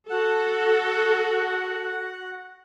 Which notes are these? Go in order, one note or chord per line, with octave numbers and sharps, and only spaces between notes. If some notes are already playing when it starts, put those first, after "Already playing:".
F#4 A4 F#5